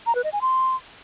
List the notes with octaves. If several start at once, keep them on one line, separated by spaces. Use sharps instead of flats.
A#5
B4
D#5
G#5
C6